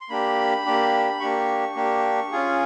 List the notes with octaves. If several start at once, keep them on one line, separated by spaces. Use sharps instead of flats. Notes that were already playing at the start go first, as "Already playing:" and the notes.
C6
A#3 D4 G4 B5
A#3 D4 G4
A#3 D4 G4 C#6
A#3 D4 G4
C#4 F4 G#4